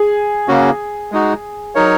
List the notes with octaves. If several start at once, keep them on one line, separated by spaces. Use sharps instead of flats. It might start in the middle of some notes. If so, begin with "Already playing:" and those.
Already playing: G#4
C#3 A#3 C#4 F#4
G#3 D#4 F#4
F#3 D#4 A#4 C#5